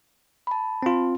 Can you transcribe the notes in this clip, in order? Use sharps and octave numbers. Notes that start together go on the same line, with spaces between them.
A5 B5
C4 F4